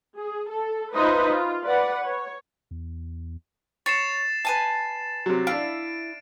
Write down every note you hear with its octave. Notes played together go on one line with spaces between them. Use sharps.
G#4
A4
D#4 F4 B4 C5 D#5 E5
F4
B4 D5 F#5
C#5
E2
C#5 A6 C7 E7
B4 G#5 A5
C3 F#3
D4 E4 F5 D7